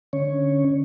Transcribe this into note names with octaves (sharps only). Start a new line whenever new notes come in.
D3 C#4 C#5